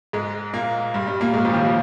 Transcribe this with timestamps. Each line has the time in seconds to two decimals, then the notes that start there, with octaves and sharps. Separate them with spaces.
0.13 G#2 G#3
0.53 A#2 A#3
0.94 G2 G3
1.07 G2 G3
1.21 A#2 A#3
1.34 G#2 G#3
1.45 F2 F3
1.53 D#2 D#3
1.64 F3